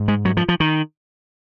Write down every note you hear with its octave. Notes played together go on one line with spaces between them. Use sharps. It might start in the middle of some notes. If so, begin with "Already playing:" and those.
Already playing: G#2
G#3
F#3
F3
F3
D#3